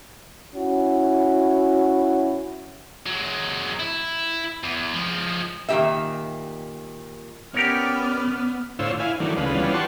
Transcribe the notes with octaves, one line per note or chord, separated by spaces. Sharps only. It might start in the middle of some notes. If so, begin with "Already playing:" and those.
C#4 E4 F#4
F#3 G#3
E4
E2
F3 G#3
A#2 D#3 A3 G4 D#5 E5
B3 C#4 G4 A#4 C#5 D5 F6
A2 D3 F4 C5 C#5 E6
E4 F5 G#5
D#3 E3 F#3 A3 D4
D2 C#3 G#3 F4 B4
E3 G3 B3 C#4 D4 F4
G4 F#5 A5 C6 C#6